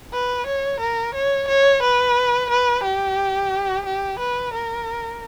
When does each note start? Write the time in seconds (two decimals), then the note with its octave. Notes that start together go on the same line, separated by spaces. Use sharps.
0.13 B4
0.47 C#5
0.80 A#4
1.15 C#5
1.48 C#5
1.82 B4
2.50 B4
2.83 G4
3.86 G4
4.19 B4
4.53 A#4